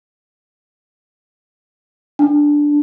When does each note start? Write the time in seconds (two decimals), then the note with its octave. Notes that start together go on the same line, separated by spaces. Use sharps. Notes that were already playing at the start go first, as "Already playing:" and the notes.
2.19 D4